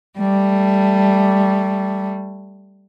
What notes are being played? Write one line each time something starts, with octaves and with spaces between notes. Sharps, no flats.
G3 A3